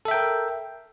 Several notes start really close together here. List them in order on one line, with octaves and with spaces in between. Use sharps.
A4 E5 G5 A#4